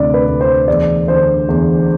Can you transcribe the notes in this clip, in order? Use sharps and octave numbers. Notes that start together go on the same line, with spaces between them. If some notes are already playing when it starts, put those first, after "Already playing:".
Already playing: D2 C3 E3 D5
B4
D2
C5
E2 D5
D3 C5
E2